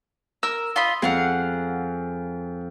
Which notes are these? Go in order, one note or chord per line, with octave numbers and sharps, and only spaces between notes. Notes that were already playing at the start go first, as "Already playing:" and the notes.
A#4 E6
F4 D#5 B5
F2 G#4 F5 F#5